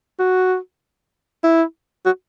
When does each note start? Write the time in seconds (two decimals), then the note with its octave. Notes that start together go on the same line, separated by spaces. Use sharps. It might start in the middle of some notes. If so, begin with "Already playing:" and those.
0.19 F#4
1.44 E4
2.06 F#4